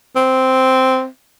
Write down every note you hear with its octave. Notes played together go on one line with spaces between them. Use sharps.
C4